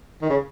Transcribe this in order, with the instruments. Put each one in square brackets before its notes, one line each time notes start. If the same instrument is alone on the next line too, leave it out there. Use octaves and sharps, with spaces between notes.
[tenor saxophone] D#3
C#3